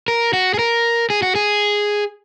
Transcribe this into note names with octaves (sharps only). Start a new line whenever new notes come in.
A#4
F#4
G#4
A#4
G#4
F#4
G#4